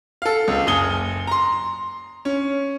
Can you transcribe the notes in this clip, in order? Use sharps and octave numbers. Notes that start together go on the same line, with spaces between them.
A4 F5
C#2
F#1 G#5 D#6 G7
A#5 C6
C#4